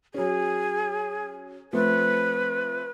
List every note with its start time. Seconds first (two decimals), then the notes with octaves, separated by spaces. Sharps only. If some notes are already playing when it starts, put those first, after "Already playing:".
0.14 F#3 C#4 G#4
1.73 F3 A3 C4 B4